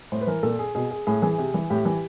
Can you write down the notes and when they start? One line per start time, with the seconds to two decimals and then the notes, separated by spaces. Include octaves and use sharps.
0.12 A2 C5
0.21 B4
0.27 E3 A#4
0.43 A#2 A4
0.59 G#4
0.75 B2 G#4
0.91 G#4
1.07 A2 G#4
1.22 E3 G#4
1.38 C3
1.54 E3
1.70 A2 G4
1.85 E3